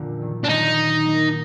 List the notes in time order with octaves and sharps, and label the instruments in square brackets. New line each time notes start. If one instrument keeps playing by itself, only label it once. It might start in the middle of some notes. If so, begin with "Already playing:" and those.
Already playing: [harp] F2 A#2 D3
D#3 F#3
[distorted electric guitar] D4
[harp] D#3 F#3 [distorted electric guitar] D#4
[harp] F#3 A#3